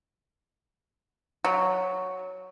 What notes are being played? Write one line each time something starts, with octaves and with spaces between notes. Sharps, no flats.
F#3